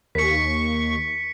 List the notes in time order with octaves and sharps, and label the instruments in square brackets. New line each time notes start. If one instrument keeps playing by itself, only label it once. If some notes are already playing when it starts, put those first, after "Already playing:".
[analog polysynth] D#2 C#6 [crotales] B6 C#7